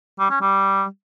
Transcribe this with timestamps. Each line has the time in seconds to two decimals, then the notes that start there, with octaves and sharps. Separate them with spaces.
0.19 G3
0.30 C#4
0.41 G3